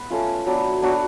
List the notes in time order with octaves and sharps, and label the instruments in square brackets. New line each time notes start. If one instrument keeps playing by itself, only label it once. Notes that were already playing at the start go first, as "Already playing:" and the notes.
Already playing: [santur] B3 B4
A3 C#4 F4
F#3 B3 D4
F#3 B3 D4 F#4